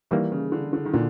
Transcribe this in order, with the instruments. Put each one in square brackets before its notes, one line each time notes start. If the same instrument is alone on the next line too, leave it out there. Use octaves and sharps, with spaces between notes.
[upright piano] D#3 [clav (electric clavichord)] E3 G3 A#3
[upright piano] C#3
D3
D3
D#3
[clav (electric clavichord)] A#2 [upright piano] D3